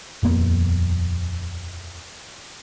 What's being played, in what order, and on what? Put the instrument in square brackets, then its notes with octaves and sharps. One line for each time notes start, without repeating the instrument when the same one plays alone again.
[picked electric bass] D#1 F2 A#3 B3